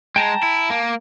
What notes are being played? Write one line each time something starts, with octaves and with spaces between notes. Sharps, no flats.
G#3 G5 A5 A#5
E4
A#3